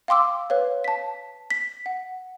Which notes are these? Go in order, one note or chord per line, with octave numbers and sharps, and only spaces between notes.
F5 G5 C6 D6 E6
B4 C#5 F5
A5 B6
B6
F#5